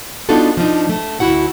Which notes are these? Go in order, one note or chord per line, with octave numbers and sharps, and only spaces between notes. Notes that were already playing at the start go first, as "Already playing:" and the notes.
B3 D4 D#4 F4 F#4 A4
F3 D4 D#4
A3
D2 C3 E4 F#4 F#5